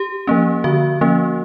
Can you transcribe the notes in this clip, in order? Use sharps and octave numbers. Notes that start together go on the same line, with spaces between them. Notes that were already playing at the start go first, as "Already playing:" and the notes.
Already playing: G4
F3 A#3 C#4
D3 F#4
F3 A#3 C#4